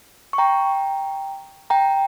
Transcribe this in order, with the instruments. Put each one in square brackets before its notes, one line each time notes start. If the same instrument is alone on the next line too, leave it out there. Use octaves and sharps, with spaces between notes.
[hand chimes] C#6
G5 A#5
G5 A#5